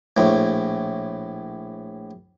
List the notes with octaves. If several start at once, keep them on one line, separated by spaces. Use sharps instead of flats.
A#1 A2